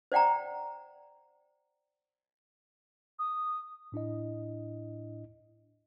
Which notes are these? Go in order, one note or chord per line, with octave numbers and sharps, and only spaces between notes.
C5 D5 F#5 G5 A#5
D#6
A2 D4 E4 D#5